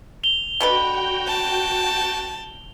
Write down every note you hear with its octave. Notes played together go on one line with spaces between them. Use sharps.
F7 G7
B2 D3 F#4 B4 G5
A5